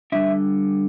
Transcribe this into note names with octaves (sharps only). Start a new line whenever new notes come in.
D3 G3 D4 E5